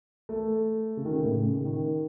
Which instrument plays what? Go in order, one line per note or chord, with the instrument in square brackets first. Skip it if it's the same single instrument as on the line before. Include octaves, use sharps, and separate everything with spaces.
[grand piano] A3
C#3
D#3
C#3
A2
C#3
D#3